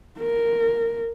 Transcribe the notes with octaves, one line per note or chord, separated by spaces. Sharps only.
A#4